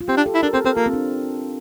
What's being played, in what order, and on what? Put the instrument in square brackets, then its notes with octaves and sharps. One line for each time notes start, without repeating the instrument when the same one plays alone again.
[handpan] F4
[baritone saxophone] C4 [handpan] G4
[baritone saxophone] D4
[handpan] A4
[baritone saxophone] E4
[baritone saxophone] D4 [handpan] A#4
[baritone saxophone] C4 [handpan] A4
[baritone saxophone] C4 [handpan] A4
[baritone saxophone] A#3 [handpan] F4
[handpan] C4
D4